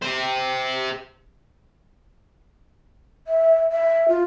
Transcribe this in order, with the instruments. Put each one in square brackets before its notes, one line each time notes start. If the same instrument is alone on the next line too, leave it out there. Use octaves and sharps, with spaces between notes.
[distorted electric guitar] G4 C5
[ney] E5
E5
F4